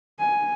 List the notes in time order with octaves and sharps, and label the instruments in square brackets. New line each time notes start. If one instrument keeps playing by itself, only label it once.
[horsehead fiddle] G#5